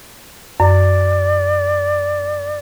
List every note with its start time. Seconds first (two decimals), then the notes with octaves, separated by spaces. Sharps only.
0.60 F#2 D5